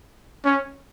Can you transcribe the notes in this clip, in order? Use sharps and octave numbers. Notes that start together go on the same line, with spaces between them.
C#4